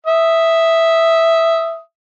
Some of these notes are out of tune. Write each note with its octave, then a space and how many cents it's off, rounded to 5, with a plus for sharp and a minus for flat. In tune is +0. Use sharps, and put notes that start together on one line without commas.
E5 +0 D#6 +0